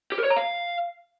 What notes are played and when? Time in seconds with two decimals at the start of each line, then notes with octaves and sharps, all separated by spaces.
0.12 G4
0.18 A#4
0.24 C#5
0.30 A#5
0.37 F5